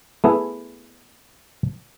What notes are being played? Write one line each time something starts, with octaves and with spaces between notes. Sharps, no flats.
A3 B3 E4 G#4